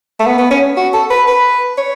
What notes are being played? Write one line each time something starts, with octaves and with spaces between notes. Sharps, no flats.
A3
B3
B3
C#4
F#4
A4
B4
B4
C#5